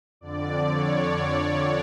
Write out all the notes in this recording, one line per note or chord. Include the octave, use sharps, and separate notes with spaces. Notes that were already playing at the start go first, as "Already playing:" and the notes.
F2 D3 D5
C#5
C#5